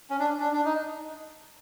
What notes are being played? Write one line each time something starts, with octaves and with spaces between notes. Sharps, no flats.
C#4
D4
D4
D4
D#4